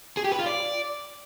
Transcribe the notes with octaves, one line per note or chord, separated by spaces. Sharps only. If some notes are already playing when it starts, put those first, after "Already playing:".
G#4
G4
B4
F4
D5